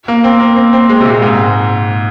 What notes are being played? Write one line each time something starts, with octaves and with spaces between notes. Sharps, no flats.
A#3
C4
A#3
C4
C4
G#3
C3
A#2
G#2